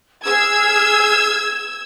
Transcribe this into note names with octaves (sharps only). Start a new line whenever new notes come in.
G#4 E6 F6 G#6